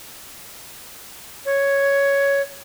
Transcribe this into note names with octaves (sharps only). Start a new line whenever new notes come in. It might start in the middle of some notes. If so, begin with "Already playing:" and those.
C#5